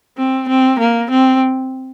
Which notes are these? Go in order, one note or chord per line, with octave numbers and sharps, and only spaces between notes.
C4
C4
A#3
C4